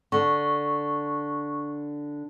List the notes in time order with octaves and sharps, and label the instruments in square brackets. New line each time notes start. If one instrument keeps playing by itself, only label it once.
[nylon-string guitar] D3 [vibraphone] C#6